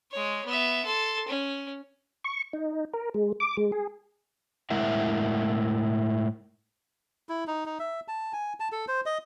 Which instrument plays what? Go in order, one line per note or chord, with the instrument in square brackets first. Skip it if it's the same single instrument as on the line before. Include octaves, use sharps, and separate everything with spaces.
[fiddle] G#3 C#5
B3 E5
A4 C6
C#4
[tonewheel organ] C#6
D#4
A#4
G#3
D6
G#3
G#4
[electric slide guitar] A2 G#3 E4 A#4 E5 F#5
[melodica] E4
D#4
D#4
E5
A5
G#5
A5
A4
C5
D#5